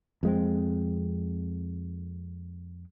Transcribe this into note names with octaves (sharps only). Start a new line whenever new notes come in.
F2 G#3 C4